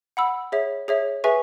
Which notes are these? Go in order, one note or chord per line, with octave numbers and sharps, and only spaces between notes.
F#5 B5 E6
G#4 C#5 E5
G#4 C#5 E5
G#4 B4 E5 G#5 C#6